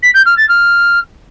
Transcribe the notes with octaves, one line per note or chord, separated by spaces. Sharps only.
B6
G6
F6
A6
F6